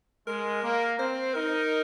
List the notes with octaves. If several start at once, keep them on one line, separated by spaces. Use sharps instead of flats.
G#3 A#4
A#3
C4 C5
D#4 A#4